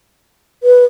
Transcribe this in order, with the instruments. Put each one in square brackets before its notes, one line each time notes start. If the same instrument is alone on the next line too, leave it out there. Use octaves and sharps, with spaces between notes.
[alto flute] B4